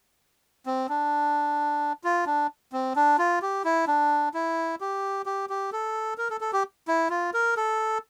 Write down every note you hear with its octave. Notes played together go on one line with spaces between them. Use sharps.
C4
D4
F4
D4
C4
D4
F4
G4
E4
D4
E4
G4
G4
G4
A4
A#4
A4
A4
G4
E4
F4
A#4
A4